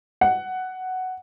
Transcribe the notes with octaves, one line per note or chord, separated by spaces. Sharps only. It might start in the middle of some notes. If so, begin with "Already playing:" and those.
F#5